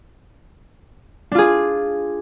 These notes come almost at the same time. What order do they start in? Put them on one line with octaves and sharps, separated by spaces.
D4 F4 G#4